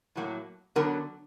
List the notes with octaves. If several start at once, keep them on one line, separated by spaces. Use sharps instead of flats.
A2 F#3 A#3
D3 F#3 B3 A#4